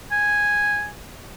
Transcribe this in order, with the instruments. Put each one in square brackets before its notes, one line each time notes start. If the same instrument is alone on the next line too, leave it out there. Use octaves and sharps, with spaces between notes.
[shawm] G#5